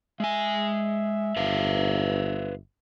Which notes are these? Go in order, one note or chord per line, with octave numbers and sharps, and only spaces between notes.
G#3 E5 G#5
G1 B4 C5 F5